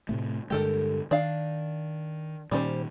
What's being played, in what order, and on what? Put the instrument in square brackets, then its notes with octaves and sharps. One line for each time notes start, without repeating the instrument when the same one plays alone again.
[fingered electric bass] A2 C3 A3
[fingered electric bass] G2 D3 G#3 [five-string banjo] G4 A4 A#4
[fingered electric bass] D#3 [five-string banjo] D4 F5
[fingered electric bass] A#2 D#3 [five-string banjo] G3 C#4 C5